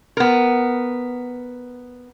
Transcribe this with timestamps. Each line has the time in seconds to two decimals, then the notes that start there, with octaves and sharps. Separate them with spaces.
0.17 B3 A#4